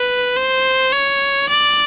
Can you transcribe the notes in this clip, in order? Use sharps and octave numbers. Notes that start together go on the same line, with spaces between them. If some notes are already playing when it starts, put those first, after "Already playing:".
Already playing: B4
C5
C#5
D5